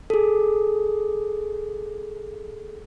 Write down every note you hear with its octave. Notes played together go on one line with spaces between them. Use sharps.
G#4 A4